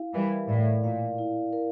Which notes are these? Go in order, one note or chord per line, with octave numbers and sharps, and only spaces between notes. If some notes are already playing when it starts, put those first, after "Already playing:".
Already playing: E4 F5
E3 G3 A#4
A2 D5
A#2 F5
E4
A#4